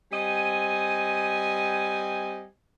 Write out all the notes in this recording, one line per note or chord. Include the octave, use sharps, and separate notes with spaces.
G3 C4 D#5 G#5